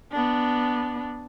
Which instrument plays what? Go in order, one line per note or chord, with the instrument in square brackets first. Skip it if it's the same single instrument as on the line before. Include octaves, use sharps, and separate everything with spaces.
[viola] B3 D4